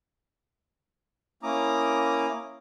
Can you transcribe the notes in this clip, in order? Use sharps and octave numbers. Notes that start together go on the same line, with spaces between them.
A#3 C#4 E4 A#5 D6 D#6